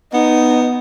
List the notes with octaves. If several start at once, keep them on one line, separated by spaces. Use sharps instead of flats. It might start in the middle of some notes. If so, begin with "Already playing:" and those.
B3 D#4